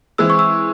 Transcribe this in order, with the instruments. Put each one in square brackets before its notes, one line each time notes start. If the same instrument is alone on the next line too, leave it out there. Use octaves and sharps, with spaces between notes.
[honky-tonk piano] E3 G#3 C4 [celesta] E6
[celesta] C#6
E6